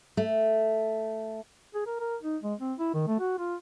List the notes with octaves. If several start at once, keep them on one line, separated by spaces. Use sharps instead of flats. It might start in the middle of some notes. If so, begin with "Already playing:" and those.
A3
G#4
A#4
A#4
D#4
G#3
C4
E4
D#3
A3
F#4
F4